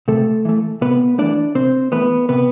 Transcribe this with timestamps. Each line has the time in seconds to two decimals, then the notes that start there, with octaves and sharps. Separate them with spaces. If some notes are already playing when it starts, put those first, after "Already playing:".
0.08 C3 A3 A4
0.45 E3 A3
0.81 C3 B3 B4
1.18 E3 A3 D4 D5
1.55 C3 C4 C5
1.92 E3 A3 B3 B4
2.29 C3 B3 B4